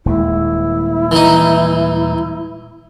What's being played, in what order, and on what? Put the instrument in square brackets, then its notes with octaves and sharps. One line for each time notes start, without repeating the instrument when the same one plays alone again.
[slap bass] D#1 D#2 G#3 [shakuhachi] E4
[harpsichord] E3 D#4